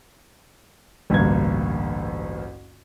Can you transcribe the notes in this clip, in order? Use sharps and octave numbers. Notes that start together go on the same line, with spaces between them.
A1 D2 G2 A#3 G#6